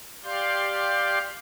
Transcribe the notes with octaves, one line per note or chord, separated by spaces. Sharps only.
G4 D5 F5 C6 G6